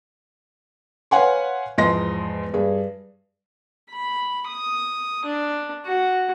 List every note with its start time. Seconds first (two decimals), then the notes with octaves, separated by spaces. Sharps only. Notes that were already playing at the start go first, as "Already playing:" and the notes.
1.11 B4 C#5 F5 F#5 G#5 C6
1.78 E2 G#2 F3 D#5 C6 A#6
2.54 G2 G#4
3.91 B5
4.48 D#6
5.26 D4
5.86 F#4